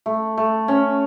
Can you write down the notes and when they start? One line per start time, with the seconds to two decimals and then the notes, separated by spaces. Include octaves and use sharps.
0.06 A3
0.37 A3
0.68 C#4